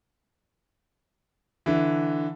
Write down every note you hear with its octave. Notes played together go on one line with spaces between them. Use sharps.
D3 E3